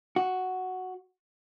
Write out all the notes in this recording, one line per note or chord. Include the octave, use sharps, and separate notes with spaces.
F#4